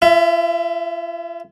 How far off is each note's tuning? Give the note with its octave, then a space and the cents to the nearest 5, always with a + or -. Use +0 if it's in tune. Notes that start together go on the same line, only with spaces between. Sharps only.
F4 -40 E5 +10